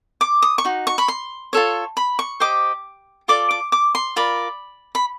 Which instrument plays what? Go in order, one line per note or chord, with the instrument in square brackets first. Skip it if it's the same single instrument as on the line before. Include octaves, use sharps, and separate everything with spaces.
[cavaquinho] D6
D#6
C#6
D#4 F#4
C#6
B5
C6
F4 A4 C#5
B5
C#6
G4 C5 D#5 D6
F4 A4 D5 D6
D6
D6
C6
F4 A#4 D5 B5
B5